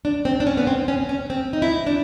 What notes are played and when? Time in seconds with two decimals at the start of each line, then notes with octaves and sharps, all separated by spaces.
0.05 D4
0.25 C4
0.40 D4
0.47 C#4
0.57 B3
0.67 C4
0.88 C#4
1.09 C#4
1.30 C4
1.53 D#4
1.62 E4
1.87 D4